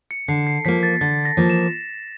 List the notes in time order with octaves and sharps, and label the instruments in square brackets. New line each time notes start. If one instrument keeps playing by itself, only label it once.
[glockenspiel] C#7
[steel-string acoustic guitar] D3 [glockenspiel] C7
[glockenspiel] C7
[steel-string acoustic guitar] F3 A#3 [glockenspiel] B6
[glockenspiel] A6
[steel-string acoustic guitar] D3 [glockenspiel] A6
[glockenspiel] A#6
[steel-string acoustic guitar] F3 A#3
[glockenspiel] E7